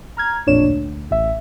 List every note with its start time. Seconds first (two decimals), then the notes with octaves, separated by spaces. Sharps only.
0.17 A#5 F6 G#6
0.46 A1 F2 A#2 D4 C#5 E7
0.66 D2
1.11 A1 E5